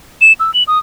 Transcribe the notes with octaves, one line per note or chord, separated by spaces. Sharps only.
E7
E6
F#7
D#6